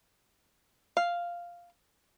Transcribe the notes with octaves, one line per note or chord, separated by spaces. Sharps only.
F5